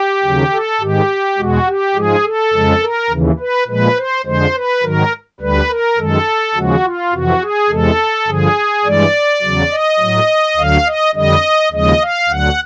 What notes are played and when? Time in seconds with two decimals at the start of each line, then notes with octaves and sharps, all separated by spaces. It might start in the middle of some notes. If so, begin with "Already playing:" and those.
Already playing: G4
0.24 D#2 C#3 F#3
0.52 A4
0.81 G#2 D#3 G#3 G4
1.38 E2 B2 G#3 F#4
1.67 G4
1.95 G#2 F3 G#3 G#4
2.25 A4
2.53 F2 C#3 F3 G#3
2.82 A#4
3.10 D#2 C#3 E3
3.39 B4
3.68 A#2 F3 G#3 B4
3.97 C5
4.26 F2 D3 F3 G#3 C5
4.54 B4
4.83 G#2 D#3 F#3 A#4
5.41 D2 D3 G3 B4
5.69 A#4
5.98 F#2 D#3 G#3 A4
6.55 D#2 C#3 F3 G#3 F#4
6.84 F4
7.13 F2 C3 E3 F#4
7.41 G#4
7.70 E2 C3 E3 G#3 A4
8.28 G2 D3 F3 G#4
8.85 G2 E3 G#3 D5
9.42 E2 C#3 F#3
9.71 D#5
9.99 A2 F#3
10.57 D2 D3 F#3 F5
10.87 D#5
11.15 F2 D3 G3 D#5
11.72 D#2 C#3 F3 G#3 D#5
12.02 F5
12.29 D2 D3 F#3 F#5